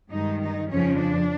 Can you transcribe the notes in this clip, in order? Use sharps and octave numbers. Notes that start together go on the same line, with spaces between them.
G2 D#3 G#3 D#4
D#4
F2 C#3 F3 C#4
D4